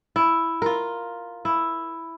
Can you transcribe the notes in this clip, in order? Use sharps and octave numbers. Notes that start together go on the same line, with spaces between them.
E4
F4 A#4
E4